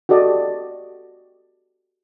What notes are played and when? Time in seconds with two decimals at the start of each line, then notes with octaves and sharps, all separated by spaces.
0.09 F#4 G4 A4 D5 D#5